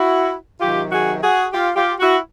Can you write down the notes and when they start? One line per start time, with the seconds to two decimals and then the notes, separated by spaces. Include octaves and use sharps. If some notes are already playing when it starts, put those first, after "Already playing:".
Already playing: E4 F#4
0.60 C3 D#3 F#3 F4 G4
0.91 F#4 G#4
1.22 F#4 G#4
1.53 F4 G4
1.76 F4 G4
2.00 E4 F#4